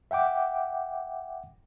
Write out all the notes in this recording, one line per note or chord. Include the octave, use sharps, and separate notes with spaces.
E5 F#5 G5 D6